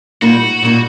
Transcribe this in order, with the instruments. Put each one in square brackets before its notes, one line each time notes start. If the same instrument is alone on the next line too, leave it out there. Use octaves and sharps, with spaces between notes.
[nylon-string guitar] A#2 G3 A#3 D#4 [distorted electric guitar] F#4
[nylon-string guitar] A#2 G3 A#3 D#4